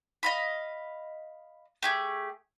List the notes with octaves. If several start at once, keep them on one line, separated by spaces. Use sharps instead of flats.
D#5 F5 B5
A3 G4 G#4